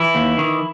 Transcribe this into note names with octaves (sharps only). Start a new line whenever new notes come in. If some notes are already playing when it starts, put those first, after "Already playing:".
Already playing: E3 E4
D#2
D#3